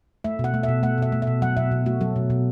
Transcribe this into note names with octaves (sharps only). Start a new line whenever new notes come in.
A3 E5
B2
F#5
A3
E5
B2
A3 F#5
B2 E5
A3
E5
B2
F#3 F#5
B2 E5
B2
A3 F#4
F#3 A4
B2
B2